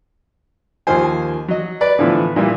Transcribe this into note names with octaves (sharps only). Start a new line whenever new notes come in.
D#2 D#3 F3 C5 G#5
F#3 D#5
B4 D5
A2 D3 E3 F3 B3
A#2 E3 G3